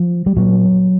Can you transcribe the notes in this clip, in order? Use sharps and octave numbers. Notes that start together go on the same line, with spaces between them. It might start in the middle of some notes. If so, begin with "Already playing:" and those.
Already playing: F3
G3
A#2 F#3